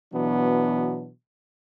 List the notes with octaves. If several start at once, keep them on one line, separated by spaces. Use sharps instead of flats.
B2 E3 F#3 B3 D4